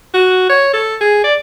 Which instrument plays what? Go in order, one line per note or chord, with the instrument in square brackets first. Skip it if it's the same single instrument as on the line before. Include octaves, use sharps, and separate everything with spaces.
[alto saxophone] F#4
C#5
A4
G#4
D5